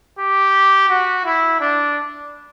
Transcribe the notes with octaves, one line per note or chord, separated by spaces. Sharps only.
G4
F#4
E4
D4